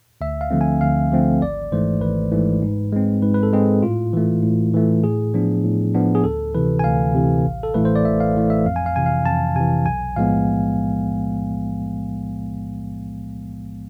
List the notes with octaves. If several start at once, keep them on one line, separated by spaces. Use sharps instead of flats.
D2 E5
F5
D3 F3 A3 C4
G#5
D2 F5
D3 F3 A3 C4
G#1 D5
G#2 E3 A3 C5
G#1 B4
G#2 E3 A3
G#2
G#3 C4
G#2 B4
B4
A4
G#3 C4 G#4
A2 F4
E3 A3
A2
E3 A3
A2 G#4
F3 B3 D4
A2
F3 B3 D4
G#4
D2 A4
C3 E3 B4
G#5
D2 F5
C3 E3
A1
A4
A2 E3 A3 B4
C5
D5
A1 E5
F5
A2 E3 A3
E5
F2 F5
G#5
F5
C3 E3 G#5
F5
F2 A5
C3 E3 G#5
B1 G#5
A2 F3 G#3 B3 F5